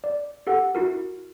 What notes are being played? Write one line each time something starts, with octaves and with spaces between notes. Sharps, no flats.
D5
G4 A4 F#5
E4 F#4 A#4